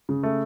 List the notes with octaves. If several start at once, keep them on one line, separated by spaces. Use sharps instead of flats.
C#3
A3